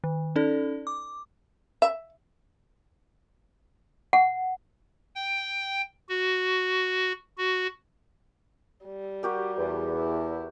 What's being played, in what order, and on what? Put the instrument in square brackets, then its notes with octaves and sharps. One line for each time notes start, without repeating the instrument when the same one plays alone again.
[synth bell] D#3
C#4 D#4 A4 D5
D6
[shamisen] E5
[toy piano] F#5
[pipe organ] G5
F#4
F#4
[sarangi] G3
[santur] F#4 G4 A#4
[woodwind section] E2
[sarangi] E4